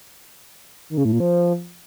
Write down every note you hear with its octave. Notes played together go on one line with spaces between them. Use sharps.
D#3
C#3
A2
A#2
F3